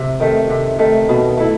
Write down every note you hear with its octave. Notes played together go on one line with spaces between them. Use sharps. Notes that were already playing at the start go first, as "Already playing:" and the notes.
Already playing: C3
D#3 A3
C3
D#3 A3
B2
A3 E4